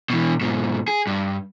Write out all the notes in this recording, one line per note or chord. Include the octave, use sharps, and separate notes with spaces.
B2 E3
G#2 B2
G#4
G2